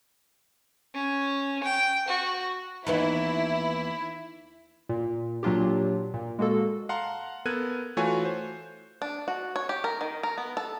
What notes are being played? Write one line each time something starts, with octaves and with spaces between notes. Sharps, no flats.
C#4
G5
F#4
D#2 E3 B3 E4
A#2
A#2 F#3 D4 F4 G4
A#2
G#3 A#3 F#4 A4
F5 F#5 A5 A#5 C6
B3 A4 A#4 F#6 G#6 D#7
E3 A3 F4 F#4 C#5 G#5
C5
D4
F#4
C#5
G4
A#4
D#3
A#4
B3
A4